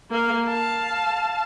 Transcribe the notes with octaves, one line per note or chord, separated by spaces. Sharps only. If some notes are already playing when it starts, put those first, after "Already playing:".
A#3 F5
F5 A5